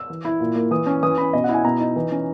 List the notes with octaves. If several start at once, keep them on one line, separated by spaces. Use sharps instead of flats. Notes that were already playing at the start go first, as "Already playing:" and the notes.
Already playing: E6
E3
E4
A#2
A#3
E3 D#6
C#4
E3 D#6
C#4 B5
B2 D#5
F#5
E4
G#5
B2 A#5
D#4
E3
C#4